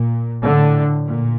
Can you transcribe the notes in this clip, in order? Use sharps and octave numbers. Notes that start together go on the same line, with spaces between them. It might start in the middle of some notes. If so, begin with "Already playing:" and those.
Already playing: A#2
A2 D3
A#2